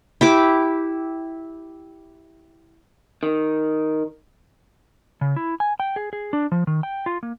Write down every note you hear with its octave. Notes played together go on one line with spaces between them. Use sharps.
E4 G4 D6
D#3
C#3
E4
G#5
G5
G#4
G#4
D4
F3
D#3
G5
F4
A#3